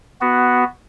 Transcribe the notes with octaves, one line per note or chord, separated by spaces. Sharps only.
B3 F#4